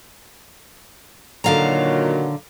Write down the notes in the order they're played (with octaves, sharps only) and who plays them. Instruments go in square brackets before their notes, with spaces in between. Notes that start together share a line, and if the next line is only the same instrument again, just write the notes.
[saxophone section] A#2 D#3 F#3 [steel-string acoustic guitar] D3 F5 A#5